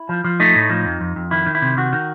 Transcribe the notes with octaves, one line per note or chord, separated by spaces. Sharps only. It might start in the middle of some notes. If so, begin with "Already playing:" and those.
Already playing: E4
F3
F3
A3 D#4
A2
F3
F2
F2
F2
D#3 E4
D#3
E4
C3
D#3 F#4
D#3